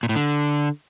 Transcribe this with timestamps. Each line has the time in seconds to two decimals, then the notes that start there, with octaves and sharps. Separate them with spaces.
0.03 A#2
0.09 A2
0.15 D3